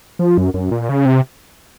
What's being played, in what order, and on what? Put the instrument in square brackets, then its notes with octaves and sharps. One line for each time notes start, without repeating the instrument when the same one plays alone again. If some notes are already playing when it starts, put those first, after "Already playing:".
[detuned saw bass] F3
F#2
F#2
A#2
C#3
C3